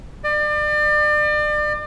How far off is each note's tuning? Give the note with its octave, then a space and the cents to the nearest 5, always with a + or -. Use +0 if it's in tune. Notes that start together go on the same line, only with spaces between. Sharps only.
D5 +35